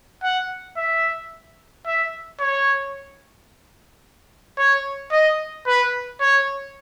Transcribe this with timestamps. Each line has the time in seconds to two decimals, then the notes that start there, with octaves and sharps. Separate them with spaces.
0.23 F#5
0.77 E5
1.86 E5
2.40 C#5
4.58 C#5
5.12 D#5
5.67 B4
6.21 C#5